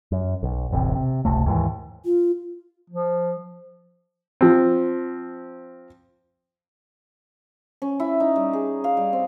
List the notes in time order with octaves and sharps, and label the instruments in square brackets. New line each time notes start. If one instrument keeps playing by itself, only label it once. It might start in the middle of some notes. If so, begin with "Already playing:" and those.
[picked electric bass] F#2
B1
E1 A1 C3
C3
F#1 C#2 C3 A3
D#2 G#2 D#3 E3
[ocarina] F4
[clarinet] F3
[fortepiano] F3 C4
[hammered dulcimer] C#4
E4
D#4
G3
G#4
F5
G3
C4